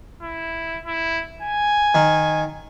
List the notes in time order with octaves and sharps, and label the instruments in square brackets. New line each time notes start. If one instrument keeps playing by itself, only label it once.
[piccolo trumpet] E4
E4
G#5
[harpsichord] D#3